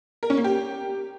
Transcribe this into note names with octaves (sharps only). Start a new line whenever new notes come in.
A#4
C#4
A#3
G4